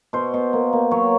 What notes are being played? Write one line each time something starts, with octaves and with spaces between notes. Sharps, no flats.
B2 C5
B2
A#3
A#3
F#3 C#5